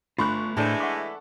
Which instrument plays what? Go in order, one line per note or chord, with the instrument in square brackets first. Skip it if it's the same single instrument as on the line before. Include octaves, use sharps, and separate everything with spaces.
[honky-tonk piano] G1 C#6 F#6 [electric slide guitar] A3 F4 [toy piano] D4 B5
[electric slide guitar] A2 C5 [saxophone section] E3 G#3 A3 [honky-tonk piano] D4 A4 [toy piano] G#5
[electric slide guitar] E5 [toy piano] F#5 C#6 D6